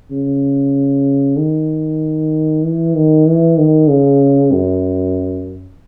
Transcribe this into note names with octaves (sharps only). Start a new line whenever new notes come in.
C#3
D#3
E3
D#3
E3
D#3
C#3
F#2